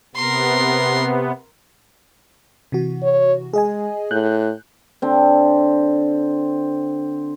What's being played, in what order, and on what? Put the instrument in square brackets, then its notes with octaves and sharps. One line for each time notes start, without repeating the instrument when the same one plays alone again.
[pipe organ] C3 B3 [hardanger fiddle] A#4 C6
[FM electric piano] C3 E3 F#4
[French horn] C#5
[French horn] G#3 [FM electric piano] G#4 D#5 G#5
[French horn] A2 [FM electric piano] F#6 G6
[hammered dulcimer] D3 C4